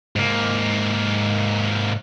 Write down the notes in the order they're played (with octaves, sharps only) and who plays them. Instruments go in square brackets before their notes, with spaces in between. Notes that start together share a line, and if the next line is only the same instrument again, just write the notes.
[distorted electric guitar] G#2 A#3